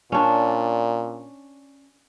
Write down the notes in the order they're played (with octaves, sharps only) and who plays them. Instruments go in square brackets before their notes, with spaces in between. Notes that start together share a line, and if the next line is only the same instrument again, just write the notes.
[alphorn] A#2 [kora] C#4 D4